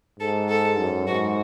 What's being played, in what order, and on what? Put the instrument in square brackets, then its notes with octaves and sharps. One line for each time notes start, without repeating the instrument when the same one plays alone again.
[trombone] G#2 [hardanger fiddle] A4
[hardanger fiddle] A4
[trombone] F#2
[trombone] G#2 [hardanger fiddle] F#4